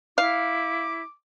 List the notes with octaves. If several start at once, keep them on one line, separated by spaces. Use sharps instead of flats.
E4 F5 D6